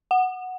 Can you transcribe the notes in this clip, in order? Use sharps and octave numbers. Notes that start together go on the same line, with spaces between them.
F#5